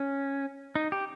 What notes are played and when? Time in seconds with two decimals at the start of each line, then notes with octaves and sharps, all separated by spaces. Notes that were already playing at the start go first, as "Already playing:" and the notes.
Already playing: C#4
0.75 D#4
0.92 G4